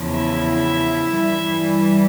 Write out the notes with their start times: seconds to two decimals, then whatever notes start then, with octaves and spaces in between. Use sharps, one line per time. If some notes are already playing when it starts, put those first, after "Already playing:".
Already playing: E2 C#3 F3
0.13 E4 E5
1.07 G2 E3 G3